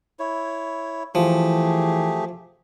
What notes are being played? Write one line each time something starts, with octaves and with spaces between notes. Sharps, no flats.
E4 C#5
E3 F3 A3 G4 G#4